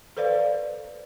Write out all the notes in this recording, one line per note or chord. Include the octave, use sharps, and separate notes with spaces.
A4 B4 C5 D5 F5